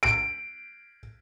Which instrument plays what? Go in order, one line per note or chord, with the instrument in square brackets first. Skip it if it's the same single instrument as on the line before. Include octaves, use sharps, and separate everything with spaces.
[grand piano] D7